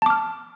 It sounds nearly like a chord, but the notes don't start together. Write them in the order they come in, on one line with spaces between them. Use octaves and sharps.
A5 D6 F6